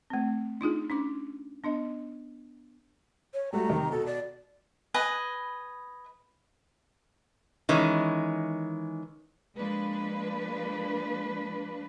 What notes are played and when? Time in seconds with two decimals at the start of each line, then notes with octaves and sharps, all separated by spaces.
0.10 A3 C4
0.61 D4 D#4 F4 G#4
0.90 C#4 D4 D6
1.64 B3 D4 D#5
3.34 C#5
3.53 G3 A3 F#4 A#5
3.69 C3 D#3
3.92 B2 A4
4.06 D5
4.94 B4 D#5 G#5
7.69 D#3 E3 G#3 C#4
9.58 F3 G#3 A#3 D4 B4